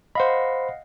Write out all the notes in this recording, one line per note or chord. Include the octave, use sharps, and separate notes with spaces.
C5 D#5 F5 F#5 B5